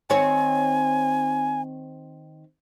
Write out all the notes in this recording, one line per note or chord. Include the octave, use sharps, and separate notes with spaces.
D#3 C4 C#5 G#5